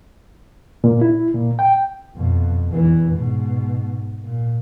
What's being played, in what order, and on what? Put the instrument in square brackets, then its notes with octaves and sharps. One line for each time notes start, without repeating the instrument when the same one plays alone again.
[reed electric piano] A#2
E4
A#2
G5
[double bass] F2 B2
E2 E3
G#2 B2
A#2